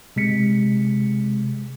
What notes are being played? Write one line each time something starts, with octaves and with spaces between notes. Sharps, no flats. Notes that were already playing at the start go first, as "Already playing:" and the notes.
C3 G#3 B6 C#7